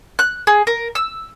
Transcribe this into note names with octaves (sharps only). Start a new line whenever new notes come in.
F#6
G#4
A#4
E6